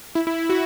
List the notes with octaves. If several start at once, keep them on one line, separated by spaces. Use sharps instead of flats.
E4
E4
E4
F#4